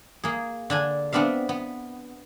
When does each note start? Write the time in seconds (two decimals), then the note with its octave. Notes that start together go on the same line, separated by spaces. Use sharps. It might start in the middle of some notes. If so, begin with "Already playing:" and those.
0.24 A#3 G#4
0.70 D3 D4 G#5
1.13 B3 C4 D4 E5 F5
1.49 B3